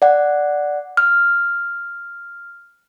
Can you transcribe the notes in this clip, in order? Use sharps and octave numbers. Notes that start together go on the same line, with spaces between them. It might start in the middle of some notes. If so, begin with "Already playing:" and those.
D5 F#5
F6